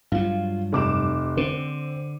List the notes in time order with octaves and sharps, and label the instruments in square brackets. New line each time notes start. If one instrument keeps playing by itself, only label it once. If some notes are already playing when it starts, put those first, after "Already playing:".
[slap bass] G2 F#3 [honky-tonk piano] F4
[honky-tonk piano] F1 D6 E7
[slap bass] D3 [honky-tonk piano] C4